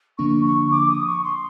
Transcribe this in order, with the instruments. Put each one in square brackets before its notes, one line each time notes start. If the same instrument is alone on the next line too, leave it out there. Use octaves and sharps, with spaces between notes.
[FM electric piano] D3 F3 A#3 D4 [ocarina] C#6
[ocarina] C#6
D6
D#6
C#6
C6